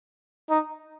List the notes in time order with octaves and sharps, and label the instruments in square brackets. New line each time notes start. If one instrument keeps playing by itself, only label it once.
[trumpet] D#4